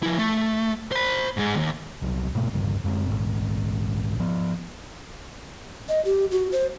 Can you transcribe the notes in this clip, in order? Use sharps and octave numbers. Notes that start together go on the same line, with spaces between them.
F3 E4
A3
C5 B5
G#2 G#3
D#2
C2 F#3
G#2 B2 A3 A#3
G1 C2 G2 C#3
F#2 G#3 C4
A#1 G#2
F3 B3
D#5
G4
F#4
C5